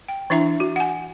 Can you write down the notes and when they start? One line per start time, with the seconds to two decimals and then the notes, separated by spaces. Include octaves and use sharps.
0.08 G5
0.30 E3 D4 E4 E5 A#5 C#6
0.60 F#4
0.76 F#5 G#5